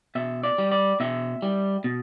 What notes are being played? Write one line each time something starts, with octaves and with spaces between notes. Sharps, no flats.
B2 E5
D5
G3
D5
B2 E5
G3
B2